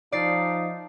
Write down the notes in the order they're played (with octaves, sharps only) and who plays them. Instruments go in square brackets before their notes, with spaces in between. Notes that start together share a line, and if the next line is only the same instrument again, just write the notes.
[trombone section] F3 D#4 [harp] D5 C7